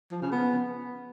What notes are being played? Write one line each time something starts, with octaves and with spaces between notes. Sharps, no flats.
F3
C#3
B3